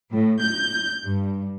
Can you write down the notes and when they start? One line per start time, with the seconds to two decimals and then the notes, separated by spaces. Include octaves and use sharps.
0.14 A2
0.43 G6
1.04 G2